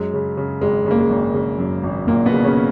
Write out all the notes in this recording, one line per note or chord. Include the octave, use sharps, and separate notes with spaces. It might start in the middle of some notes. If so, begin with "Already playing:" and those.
Already playing: F#2 G#3
C#3
C#3
G#1 G#3
C#3 A#3
G#3
G#1
C#3
F#2
G#1
G#1 A#2 A#3
B2 B3
C#3
C#3 C#4